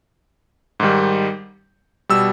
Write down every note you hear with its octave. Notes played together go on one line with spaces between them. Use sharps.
G#2 D#3 G3
B2 G3 E6